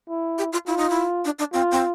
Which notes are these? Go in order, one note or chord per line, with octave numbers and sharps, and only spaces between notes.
E4
G4
F4
E4 F4
D#4
E4
D4
D4
C4 F4
C4